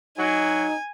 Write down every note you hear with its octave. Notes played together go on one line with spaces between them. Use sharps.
F#3 D#4 G#5